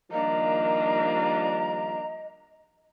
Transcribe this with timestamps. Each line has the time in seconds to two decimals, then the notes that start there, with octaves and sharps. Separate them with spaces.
0.12 D#3 F3 G3 A#3 D4 D#5 A#5